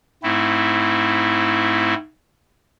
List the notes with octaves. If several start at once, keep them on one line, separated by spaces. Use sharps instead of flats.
G#2 A3 C4 E4